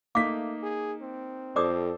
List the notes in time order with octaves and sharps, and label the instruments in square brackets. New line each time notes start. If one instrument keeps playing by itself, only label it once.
[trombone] A3 [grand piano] A#3 D#4 B6 [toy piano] F5 D6
[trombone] G#4
C4
[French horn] F2 [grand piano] A4 C5 [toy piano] D5 D6 D#6